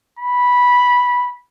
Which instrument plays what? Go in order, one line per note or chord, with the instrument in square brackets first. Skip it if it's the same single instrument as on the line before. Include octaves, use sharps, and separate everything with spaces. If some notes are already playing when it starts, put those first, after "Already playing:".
[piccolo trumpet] B5